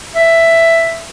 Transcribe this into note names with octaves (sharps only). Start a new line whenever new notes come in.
E5